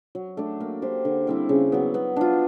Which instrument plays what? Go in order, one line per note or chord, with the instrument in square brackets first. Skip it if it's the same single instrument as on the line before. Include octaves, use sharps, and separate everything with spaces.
[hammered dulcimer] F#3
A3 D4
A#3
D4 G4 C5
D3
G3 C4 E4
C#3
F#3 B3
B3
D4 F4